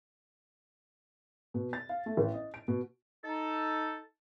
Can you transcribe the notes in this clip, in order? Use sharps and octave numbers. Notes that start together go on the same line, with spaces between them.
B2
A6
F5
A3
A1
D#5
D7
B2
D#4 A4